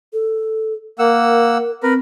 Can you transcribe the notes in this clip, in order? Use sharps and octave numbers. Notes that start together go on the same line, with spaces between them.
A4
A#3 A#4 F#5 E6
C4 A#4 B4